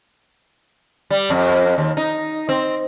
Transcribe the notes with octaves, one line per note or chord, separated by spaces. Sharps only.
G3
F2
D#2
D#4
C4